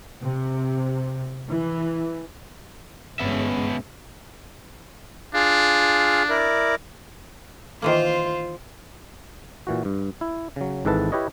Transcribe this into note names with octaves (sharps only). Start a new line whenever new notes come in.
C3
E3
G1 B2 G#3 B3 C#4 E5
D4 F4 G#4 F5
E4 A#4 D5
D#3 E3 A#3 F4 C5
A#2 E3 F#4
G2
E4
C#3 F#3
G#1 G#2 E3 A4 B4 A5
E4 G4 B4 C#5 D#5